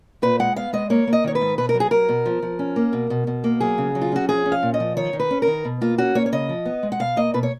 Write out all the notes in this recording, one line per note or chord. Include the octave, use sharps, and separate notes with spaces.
A#2 B4
G#3 F#5
B3 F5
G#3 D#5
A#3 C#5
A#3
D#5
D#3 C#5
B4
G#2
B2 B4
A#4
F#3
G#4
F#3 A#4
B2
F3
F3
C#4
A#3
B2
B2
B2
A#3
F#3 G#4
C#3
F#3
F4
C#4 F#4
F3 G#4
C#4
F5
A#2
D#5
F3
D#3 C#5
D#3
B4
C#4
A#4
D#3
B2
A#3 F4
C#4 F#4
A#3 C#5
C#5
C#3 D#5
F3
B3
G#3
F#5
B2 F5
A#3 D#5
B2 B4
C#5